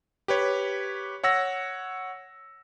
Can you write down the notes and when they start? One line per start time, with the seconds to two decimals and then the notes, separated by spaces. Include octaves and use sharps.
0.28 G4 B4 C#5
1.23 C#5 F#5 E6 A#6